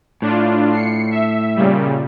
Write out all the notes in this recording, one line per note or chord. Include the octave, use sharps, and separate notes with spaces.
A2 D4 F4
C7 C#7
E5
A#2 C#3 G3